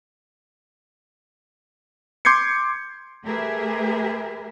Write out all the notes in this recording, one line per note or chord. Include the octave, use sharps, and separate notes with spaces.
C6 D6 G6 G#6 C7 C#7
A3 G4 G#4 A#4 B4 E5